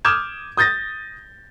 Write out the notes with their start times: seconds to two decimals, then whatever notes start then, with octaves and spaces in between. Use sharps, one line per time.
0.05 D6 D#6 F6 G6 G#6 E7
0.57 D#6 G6 A6 A#6